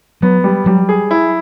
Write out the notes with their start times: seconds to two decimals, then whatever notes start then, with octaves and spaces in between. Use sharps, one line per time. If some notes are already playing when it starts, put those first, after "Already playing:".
0.22 F#3 B3
0.44 G3
0.66 F#3 G3
0.89 G#4
1.11 E4